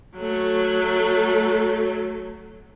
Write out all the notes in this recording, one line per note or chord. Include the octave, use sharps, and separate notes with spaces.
F#3 A3